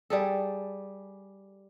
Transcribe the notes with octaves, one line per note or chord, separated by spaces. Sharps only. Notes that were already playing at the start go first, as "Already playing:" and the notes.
G3 G#4 A4